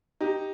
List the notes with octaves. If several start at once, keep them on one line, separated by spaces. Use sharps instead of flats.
D#4 G4